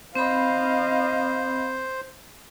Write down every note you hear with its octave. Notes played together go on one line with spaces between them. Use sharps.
C4 C5 D#5 F5 B5